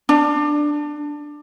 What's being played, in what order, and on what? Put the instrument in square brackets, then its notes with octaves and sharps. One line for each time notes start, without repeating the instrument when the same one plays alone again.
[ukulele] D4